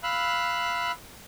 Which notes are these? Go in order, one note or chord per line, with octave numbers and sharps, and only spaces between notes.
F5 B5 E6 F#6